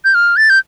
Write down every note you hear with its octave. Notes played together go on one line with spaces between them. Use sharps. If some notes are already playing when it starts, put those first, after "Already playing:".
G6
F6
A6
G6